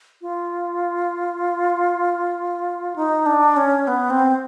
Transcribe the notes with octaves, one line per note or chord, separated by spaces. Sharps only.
F4
D#4
D4
C#4
B3
C4